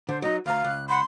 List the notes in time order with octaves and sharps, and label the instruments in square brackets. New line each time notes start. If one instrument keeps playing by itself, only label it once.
[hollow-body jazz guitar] D3 [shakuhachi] C5
[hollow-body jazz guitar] F#3 D#4 [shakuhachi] D#5
[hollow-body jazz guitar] D2 A#5 [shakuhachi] F5
[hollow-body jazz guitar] C#2 [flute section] F#6
[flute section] F#5 B5 [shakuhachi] C6